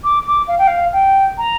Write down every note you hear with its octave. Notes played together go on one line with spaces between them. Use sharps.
D6
D6
F5
G5
F5
G5
A#5